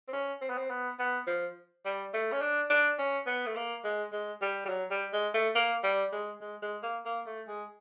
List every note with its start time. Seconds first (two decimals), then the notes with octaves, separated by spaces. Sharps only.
0.08 C4
0.13 C#4
0.41 C4
0.50 B3
0.58 C4
0.70 B3
0.99 B3
1.27 F3
1.85 G3
2.13 A3
2.32 C#4
2.42 D4
2.70 D4
2.99 C#4
3.27 B3
3.47 A3
3.56 A#3
3.84 G#3
4.12 G#3
4.42 G3
4.65 G3
4.69 F#3
4.91 G3
5.13 G#3
5.34 A3
5.55 A#3
5.83 G3
6.12 G#3
6.41 G#3
6.62 G#3
6.83 A#3
7.05 A#3
7.27 A3
7.48 G#3